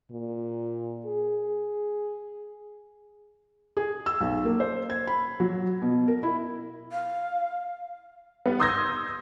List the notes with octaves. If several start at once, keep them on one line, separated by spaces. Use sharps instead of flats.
A#2
G#4
G#4
E6
B1
A#3
C5
G#6
B5
F#3
B2
A#4
E4
F5
G3 B3
C6 D#6 E6 G6 G#6 A#6